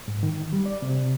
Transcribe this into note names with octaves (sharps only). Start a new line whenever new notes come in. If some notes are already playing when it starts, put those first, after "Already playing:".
G#2
D#3
G3
D5
C3